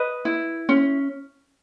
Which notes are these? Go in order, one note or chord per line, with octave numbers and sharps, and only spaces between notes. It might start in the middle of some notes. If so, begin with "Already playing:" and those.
Already playing: B4 D#5
E4
C#4